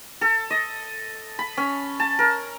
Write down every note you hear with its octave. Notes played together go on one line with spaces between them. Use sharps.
A4
D#5
B5
C#4
A5
A#4